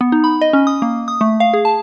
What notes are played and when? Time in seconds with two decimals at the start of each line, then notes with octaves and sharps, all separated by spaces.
0.01 B3
0.12 D#4
0.24 B5
0.41 D#5
0.53 C#4
0.67 D#6
0.82 A#3
1.08 D#6
1.21 A3
1.40 F5
1.54 G#4
1.65 A5